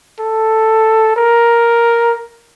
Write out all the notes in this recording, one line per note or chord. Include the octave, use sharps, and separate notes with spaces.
A4
A#4